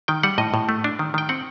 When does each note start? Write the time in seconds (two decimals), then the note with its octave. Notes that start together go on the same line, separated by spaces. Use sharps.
0.08 D#3 G5
0.23 G3 F#5
0.38 A2 D#5
0.54 A2
0.69 A3
0.84 D4
0.99 D#3
1.14 D#3 G5
1.29 C4 F#5